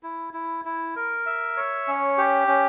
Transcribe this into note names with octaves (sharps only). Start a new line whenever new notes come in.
E4
E4
E4
A#4
E5
C#5
C#4
G4
C#4